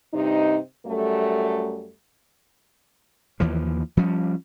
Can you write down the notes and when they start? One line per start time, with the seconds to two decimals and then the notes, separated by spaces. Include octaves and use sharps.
0.14 G2 C3 D#4
0.86 F#2 G3 A3
3.40 D#2 E3 F3
3.97 F3 G3 C#4